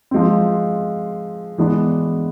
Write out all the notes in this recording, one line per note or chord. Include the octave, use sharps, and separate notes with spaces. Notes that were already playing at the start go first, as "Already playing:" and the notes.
F3 G#3 C4
E3 G#3 B3 D4